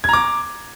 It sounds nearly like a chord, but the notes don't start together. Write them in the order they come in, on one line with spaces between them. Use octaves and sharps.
G#6 A#5 D6